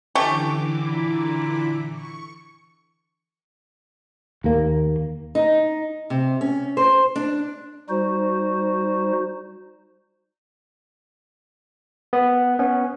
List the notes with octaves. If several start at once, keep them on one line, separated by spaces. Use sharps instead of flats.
D3 E3 A3 C#4 G4 D6
A#2 E4
C#6
D#2 A#3
D#4
C3
C#4
C5
D4
G3 D#4 F#4 C5
B3
B3 C#4